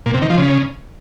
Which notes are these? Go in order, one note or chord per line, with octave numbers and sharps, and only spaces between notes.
A#2
C3
D#3
F3
C#3